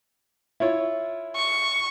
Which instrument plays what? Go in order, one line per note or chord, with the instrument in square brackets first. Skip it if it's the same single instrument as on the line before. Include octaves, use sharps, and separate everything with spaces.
[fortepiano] E4 F4 C#5
[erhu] C#6